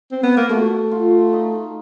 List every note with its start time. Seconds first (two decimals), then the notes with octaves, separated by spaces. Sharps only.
0.11 C4
0.24 B3
0.37 A#3
0.49 A3 F#4
0.91 F4
1.33 D#4